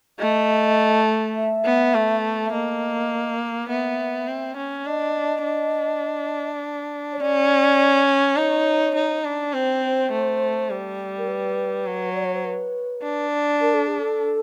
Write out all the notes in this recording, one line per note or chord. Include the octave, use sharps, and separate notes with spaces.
A3 D#5
E5
B3
A3
E5
A#3 D#5
B3 E5
C4
C#4
D4 D#5
D4
C#5
C#4 D5
D#4 C#5
D#4
D4
C4 C5
A3
G3
A#4
B4
F#3
D5
C#5
C5
B4
D4
A#4
A4
G#4
A4